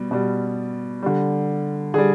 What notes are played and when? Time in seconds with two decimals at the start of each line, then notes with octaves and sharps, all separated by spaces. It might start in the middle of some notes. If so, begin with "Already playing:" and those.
Already playing: B2 G3
0.11 B2 G3
1.03 D3 G3
1.94 D3 G#4
1.98 G3